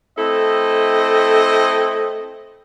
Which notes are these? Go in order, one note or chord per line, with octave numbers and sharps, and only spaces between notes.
A3 C4 E4 A4 D#5